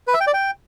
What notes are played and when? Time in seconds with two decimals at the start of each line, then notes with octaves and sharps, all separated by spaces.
0.07 B4
0.14 E5
0.21 G5
0.27 D5
0.34 G5